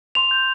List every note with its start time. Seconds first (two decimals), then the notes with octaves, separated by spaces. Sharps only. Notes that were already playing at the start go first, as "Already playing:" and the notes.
0.15 C6 F7
0.31 G6